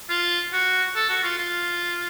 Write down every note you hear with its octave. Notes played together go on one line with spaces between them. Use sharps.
F4
F#4
A4
F#4
F4
F4